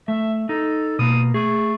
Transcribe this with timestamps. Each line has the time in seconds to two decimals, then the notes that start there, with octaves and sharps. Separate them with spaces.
0.08 A3 E5
0.49 D#4 A4
0.99 B2 A#3 D#6
1.34 A3 G#4